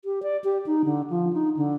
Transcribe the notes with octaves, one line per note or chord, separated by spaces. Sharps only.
G4
D5
G4
D#4
D3
F3
D#4
D3